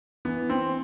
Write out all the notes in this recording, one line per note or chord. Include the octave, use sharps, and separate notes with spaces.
E3 B3
C4